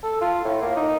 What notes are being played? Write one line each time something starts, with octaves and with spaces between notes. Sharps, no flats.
A4
F4
A2
A#3
D#4